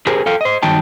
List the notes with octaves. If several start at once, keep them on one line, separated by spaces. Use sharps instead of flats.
G4 G#4 A#4 C5 G#5
A4 F5 G5
C5 D#5
G2 D#3 F#3 D#4 G5 A5